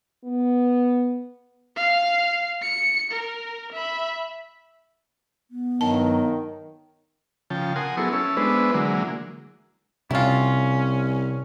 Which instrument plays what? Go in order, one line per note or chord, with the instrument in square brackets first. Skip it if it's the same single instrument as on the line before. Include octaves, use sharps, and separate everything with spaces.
[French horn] B3
[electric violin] F5
C#7
A#4
E5 B5
[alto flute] B3
[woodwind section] G2 F#3 [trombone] D#3 [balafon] A5
[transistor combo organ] C#3 F3 G5 A5
A#4 F#5 G#5 C6 D#6
F#3 B3 E4 G#4 A4 C#6
C#4 E4 A4
G#3 B3 D4 E4 B4 C5
D3 E3 F#3 G#3 A#3
[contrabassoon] C2 [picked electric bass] C3 [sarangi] C#4 [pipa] E4 F4